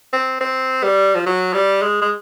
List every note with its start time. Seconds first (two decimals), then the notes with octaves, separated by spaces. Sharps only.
0.13 C4
0.41 C4
0.84 G3
1.15 F3
1.26 F#3
1.54 G3
1.82 G#3
2.02 G#3